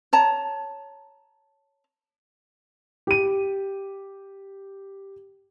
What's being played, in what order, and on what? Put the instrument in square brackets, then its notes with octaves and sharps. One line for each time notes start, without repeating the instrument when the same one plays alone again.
[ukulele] C#5 A5 A#5
[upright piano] G4 D#7